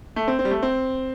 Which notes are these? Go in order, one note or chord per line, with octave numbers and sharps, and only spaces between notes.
A3
C4
C4
G3
A3
C4